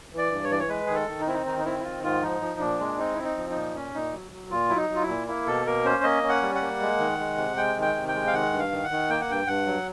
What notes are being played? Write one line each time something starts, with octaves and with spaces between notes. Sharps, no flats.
E3
D5
G2
C#5
E3 D5
C#5
G#3 B4
D#3 G#4
A4
D#3
D#4
C4 E4
D#4
D#3 D#4
D#4
C4 E4
E4
D#3 F4
G#2 F4
F3 D#4
F3
A#2 D4
G#3
C4 D#4
C4 E4
D#4
F3
D#4
A#2
C#4
A#2 D#4
F#3
F#3
A#2 F4
F#3 E4
D#4
F#3
F4
E4
A#2
A#3 E4
B2 A4
A#3 A#4
C#4 C5
A#3 D#5
C#4
F#5
G3
F#5
A#3
G#3
D#3
G#3
C3
G#3 G5
D#3
G5
C3
G5
G#3
F5
D#3 F#5
G2
F5
D#3
F#5
D#3
A#3 G5
F#5
G2 G5
G2 F#5
F#3